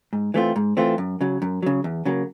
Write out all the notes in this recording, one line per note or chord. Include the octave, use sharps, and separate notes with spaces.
G#2
E3 A3 C4 F4
G#2
E3 A3 C4 F4
F#2
C#3 F#3
F#2
C#3 F#3
E2
C#3 F#3 A#3